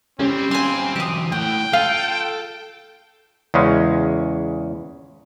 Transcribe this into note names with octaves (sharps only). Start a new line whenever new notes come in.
G3 C4 C#4
G3 F4 G#5 C6
E3 F#3 G4 D#6
A2 F#5 G5
F4 A4 F5
E2 C#3 G#3 C#4